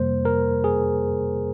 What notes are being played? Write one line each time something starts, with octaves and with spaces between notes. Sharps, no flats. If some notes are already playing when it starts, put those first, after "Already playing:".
Already playing: F2 C3 G3 A#3 C5
A#4
G#4